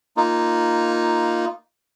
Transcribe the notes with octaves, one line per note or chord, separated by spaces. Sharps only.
A#3 D#4 F4